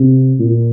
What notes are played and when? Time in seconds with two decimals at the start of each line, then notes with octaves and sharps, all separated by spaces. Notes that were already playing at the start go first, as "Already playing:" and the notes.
Already playing: C3
0.39 A#2